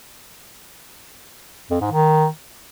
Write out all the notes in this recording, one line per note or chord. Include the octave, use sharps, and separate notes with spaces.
F2
G#2
D#3